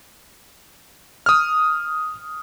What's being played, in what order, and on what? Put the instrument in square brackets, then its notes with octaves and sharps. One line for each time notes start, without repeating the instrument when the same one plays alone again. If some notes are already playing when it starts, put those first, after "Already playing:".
[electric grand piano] D#6 F6